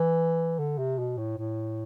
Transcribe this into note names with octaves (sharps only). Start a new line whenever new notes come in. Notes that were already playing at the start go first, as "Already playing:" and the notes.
Already playing: E3
D3
C3
B2
A2
A2